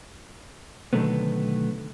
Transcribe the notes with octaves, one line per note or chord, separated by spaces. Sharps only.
B2 D3 D#3 F#3 A3 B3